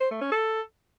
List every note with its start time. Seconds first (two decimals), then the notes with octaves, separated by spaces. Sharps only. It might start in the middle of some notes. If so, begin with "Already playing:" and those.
0.01 C5
0.11 A3
0.21 C#4
0.32 A4